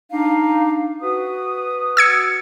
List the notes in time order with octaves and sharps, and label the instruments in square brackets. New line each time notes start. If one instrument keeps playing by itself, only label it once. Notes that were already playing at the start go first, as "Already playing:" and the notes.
[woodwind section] D4 D#4 F5
F#4 B4 D#6
[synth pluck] E6 G#6 C#7